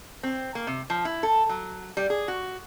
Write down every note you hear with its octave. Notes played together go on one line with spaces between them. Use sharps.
C4
A#3
C3
F3
E4
A4
F#3
G3
G#4
F#4